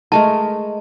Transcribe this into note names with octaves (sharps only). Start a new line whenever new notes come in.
G#3 A3 A#4 A5